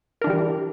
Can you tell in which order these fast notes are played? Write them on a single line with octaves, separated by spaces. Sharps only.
A#4 D4 E3 G3